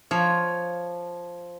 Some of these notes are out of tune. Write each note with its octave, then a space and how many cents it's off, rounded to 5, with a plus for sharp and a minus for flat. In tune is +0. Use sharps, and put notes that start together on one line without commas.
F3 +0 C#5 +0